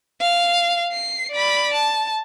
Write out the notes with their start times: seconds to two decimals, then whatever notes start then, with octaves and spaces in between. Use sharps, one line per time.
0.21 F5
0.92 C7
1.32 D5 B5
1.73 A5